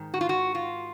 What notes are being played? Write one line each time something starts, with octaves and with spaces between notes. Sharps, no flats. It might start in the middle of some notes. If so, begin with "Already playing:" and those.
Already playing: G#2 D#3
F#4
F4
F#4
F4